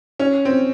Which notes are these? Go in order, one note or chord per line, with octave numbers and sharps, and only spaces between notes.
C#4
C4